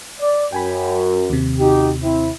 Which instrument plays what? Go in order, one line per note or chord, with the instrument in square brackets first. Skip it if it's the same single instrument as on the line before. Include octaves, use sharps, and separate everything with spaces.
[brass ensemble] D5
[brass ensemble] F#2 [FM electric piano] G5 G#5 B5
[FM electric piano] D#2 C3
[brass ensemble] D#4 F#4 G4
C4 E4